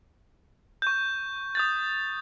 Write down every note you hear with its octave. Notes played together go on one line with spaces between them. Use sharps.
C#6 G6
D#6 G6 A6